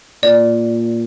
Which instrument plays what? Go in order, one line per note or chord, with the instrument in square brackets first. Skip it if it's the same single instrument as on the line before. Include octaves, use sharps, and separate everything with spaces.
[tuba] A#2 [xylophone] D5